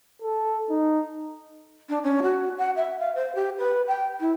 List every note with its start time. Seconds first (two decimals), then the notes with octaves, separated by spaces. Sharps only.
0.22 A4
0.70 D#4
1.89 D4
2.04 C#4
2.23 F#4
2.58 F#5
2.76 E5
2.99 F5
3.15 C5
3.35 G4
3.58 B4
3.88 G5
4.20 E4